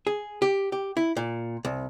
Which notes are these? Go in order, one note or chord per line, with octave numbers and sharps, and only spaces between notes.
G#4
G4
G4
E4
A#2
C2